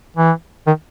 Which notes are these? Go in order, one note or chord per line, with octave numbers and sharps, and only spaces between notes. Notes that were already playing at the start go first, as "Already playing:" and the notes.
E3
D#3